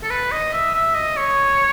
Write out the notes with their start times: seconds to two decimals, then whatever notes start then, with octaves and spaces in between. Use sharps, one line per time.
0.03 A4
0.10 B4
0.32 D#5
0.53 E5
0.74 E5
0.95 D#5
1.17 C#5